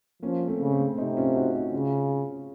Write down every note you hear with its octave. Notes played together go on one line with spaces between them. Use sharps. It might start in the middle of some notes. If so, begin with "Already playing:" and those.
F3 A#3 C#4
A3 C4
C#3
A3 C4
C3 C4 D#4
C#4 F4
D#4 F#4
C4 D#4
C#3 C#4 F4